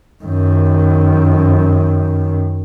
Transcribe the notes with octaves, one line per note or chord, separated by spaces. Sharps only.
F#2 D#3